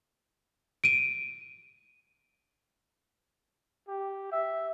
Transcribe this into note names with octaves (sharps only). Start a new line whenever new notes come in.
D7 D#7
G4
E5